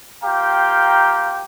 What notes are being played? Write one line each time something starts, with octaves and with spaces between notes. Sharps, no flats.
A#3 F4 G4 F5 G5 A#5